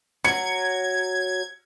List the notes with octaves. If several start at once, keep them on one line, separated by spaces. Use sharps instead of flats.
F#3 G#6 C#7